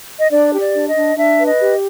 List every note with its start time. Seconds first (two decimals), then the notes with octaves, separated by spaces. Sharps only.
0.20 D#5
0.30 D4 D5
0.52 G4
0.60 D5
0.74 D4
0.89 D#5
0.95 D4
1.17 D4 E5
1.39 B4
1.46 D#5
1.60 G4